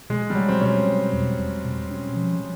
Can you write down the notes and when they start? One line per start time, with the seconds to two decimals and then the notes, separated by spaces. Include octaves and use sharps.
0.10 B2 G#3
0.30 G3
0.35 B2 F#3
0.49 C4
0.61 B2 C#4
0.87 B2
1.13 E2
1.39 E2
1.65 B2
1.91 C#4
2.16 F3